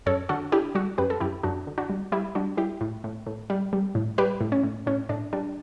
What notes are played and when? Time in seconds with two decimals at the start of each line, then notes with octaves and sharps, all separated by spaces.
0.06 F#2 A4 C#5
0.29 D3 F#4 A4
0.52 D3 E4 G4
0.75 G3 F#4 A4
0.98 F#2 G4 B4
1.10 A4
1.20 F#2 E4 G4
1.43 F#2 D4 F#4
1.67 D3
1.78 D4 F#4
1.90 G3
2.12 G3 E4 G4
2.35 G3 D4 F#4
2.57 G3 E4 G4
2.81 A2
3.04 A2
3.27 A2
3.50 G3
3.73 G3
3.95 A2
4.18 G3 G4 B4
4.41 A2
4.52 C#4
4.64 A2
4.87 A2 C#4
5.09 A2 D4
5.33 G3 D4